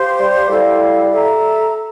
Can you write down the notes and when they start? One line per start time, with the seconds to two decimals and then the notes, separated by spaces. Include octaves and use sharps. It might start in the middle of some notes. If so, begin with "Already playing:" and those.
Already playing: G4 C5 F5 C6
0.19 G3
0.49 G3 E4 A4 D5 F5
1.11 A4 E5 A#5